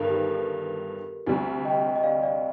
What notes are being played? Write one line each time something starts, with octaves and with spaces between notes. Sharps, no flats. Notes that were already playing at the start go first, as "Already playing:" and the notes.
Already playing: G1 G2 D#3 A4 A#4
G4
A4
D2 C3 G3
D#5 G5
D#5
D5 F5
D5 F5